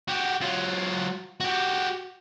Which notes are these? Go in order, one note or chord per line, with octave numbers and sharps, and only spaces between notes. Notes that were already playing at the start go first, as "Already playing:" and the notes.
F#4 G4
F#3 F4
F#4 G4